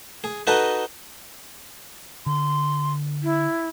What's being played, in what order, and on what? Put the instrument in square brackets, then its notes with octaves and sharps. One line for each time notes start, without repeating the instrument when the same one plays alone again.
[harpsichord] G#4
D#4 F#4 A4 B4 D#5
[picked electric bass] D3 [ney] C6
[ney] E4